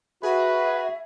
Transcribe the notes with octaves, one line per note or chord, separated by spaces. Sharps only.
F#4 G#4 B4 E5